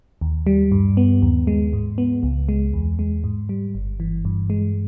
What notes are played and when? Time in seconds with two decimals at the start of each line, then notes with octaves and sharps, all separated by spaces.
0.21 D#2
0.47 G3
0.72 G2
0.97 B3
1.22 D#2
1.47 G#3
1.73 G#2
1.98 B3
2.23 C#2
2.49 G#3
2.73 E2
2.99 G#3
3.24 G#2
3.49 G3
3.75 G1
4.00 E3
4.25 G2
4.50 G#3